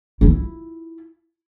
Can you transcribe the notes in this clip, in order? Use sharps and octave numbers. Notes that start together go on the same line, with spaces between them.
E4 F4